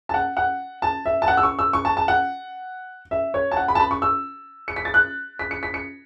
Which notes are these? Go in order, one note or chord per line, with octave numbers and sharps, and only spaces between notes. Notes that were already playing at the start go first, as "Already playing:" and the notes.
A5
F#5
F#5
A5
E5
A5
F#5
E6
C#6
E6
C#6
A5
A5
F#5
E5
C#5
A5
F#5
B5
A5
B5
C#6
E6
C#7
B6
A6
F#6
B6
C#7
B6
C#7